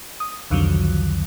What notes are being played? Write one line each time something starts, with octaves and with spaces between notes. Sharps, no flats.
D#6
C2 F2 D3 D#3 F3 F#3